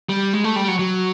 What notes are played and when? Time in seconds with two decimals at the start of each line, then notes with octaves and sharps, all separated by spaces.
0.09 G3
0.33 G#3
0.44 A3
0.56 G3
0.68 F#3
0.79 F#3